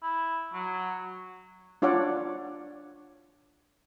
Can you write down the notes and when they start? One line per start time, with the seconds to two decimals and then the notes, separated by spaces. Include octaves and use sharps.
0.02 E4
0.53 F#3
1.82 D4 F4 C#5 D5 F#5